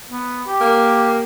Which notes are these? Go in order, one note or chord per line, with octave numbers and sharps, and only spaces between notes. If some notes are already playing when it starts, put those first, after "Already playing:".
B3
G4
A#3